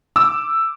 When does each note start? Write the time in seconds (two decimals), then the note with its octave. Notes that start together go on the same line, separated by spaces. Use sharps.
0.16 D6 E6